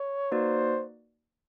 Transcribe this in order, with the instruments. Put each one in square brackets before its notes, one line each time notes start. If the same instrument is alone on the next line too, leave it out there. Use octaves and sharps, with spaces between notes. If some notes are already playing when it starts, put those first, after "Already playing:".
Already playing: [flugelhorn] C#5
[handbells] A#3 D#4 F#4 B4 D5 [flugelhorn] C5